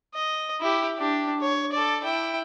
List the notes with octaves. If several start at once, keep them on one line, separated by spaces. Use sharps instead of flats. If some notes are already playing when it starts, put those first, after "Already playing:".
D#5
E4 G4
D4 G4
C#5
A4 D5
E4 G5